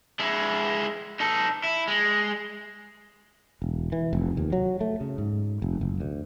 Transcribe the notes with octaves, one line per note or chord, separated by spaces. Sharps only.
G#3 E4
D#4 A4
E4
G#3
E1
E3
F1
D#2
F#3
A3
C#3
G#2
F1
F#1
D2